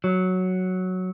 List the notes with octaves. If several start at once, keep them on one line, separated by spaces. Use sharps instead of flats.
F#3